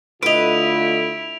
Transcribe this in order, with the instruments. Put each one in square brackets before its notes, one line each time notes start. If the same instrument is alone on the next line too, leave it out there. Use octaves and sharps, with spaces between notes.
[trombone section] D3 A3 F4 [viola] E4 [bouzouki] B4 D#5 [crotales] D7 F7